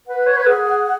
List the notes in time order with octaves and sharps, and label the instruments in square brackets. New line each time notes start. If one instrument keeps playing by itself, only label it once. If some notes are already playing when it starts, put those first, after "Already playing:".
[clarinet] B4 [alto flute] F#5
[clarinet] C#5
B4
G#4